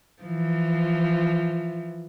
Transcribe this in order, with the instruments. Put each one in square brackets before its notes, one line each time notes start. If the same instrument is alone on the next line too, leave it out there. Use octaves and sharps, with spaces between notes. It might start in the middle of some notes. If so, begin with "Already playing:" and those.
[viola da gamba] E3 F3